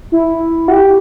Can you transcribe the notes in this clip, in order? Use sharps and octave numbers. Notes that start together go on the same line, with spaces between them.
E4
F#4
G4